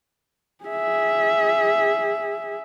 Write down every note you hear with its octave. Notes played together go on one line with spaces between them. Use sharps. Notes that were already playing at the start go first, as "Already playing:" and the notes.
G#4 E5